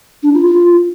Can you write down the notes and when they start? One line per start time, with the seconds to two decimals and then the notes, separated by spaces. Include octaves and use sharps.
0.23 D4
0.34 F4
0.45 F4